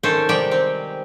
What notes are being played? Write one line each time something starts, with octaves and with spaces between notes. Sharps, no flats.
D#3 C#4 A4 C5
C3 G3 G#3 G4 G5
C4